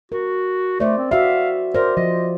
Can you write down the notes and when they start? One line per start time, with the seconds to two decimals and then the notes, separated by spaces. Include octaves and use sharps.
0.12 F#4 A#4
0.80 A3 C5 D5
0.98 C4
1.11 F#4 E5 F5
1.74 A#4 C5 D5
1.97 F3 D#5